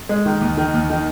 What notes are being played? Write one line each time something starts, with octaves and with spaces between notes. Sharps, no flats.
G#3
D#3
D#2
D#3
D#2
D#3